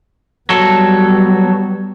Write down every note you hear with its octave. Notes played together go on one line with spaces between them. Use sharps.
F#3 G3 B3 A4